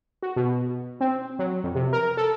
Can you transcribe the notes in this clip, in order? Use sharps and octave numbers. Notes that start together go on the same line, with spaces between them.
F#4
B2
C4
F#3
F2
C3
A#4
A4